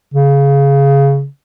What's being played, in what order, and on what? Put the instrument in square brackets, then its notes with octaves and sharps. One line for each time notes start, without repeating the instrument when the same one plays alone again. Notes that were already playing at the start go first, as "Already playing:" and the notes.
[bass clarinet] C#3